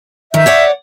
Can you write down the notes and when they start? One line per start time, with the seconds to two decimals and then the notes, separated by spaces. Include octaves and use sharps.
0.34 D#3 E5 G6
0.46 C#5 D5 F#5